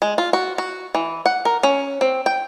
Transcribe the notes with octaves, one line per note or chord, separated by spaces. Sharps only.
G#3
F4
F#4
F#4
E3
F#5
A#4
C#4
C4
G5